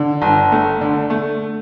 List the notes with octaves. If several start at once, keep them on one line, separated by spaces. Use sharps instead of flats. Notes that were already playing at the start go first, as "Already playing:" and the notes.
Already playing: D3
G1
A3
D3
A3